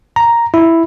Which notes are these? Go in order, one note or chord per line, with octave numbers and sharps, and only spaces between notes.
A#5
E4